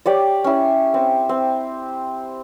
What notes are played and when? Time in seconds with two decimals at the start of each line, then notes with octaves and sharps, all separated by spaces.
0.06 G4 C#5 D5
0.44 C#4 E4
0.94 C4
1.29 C4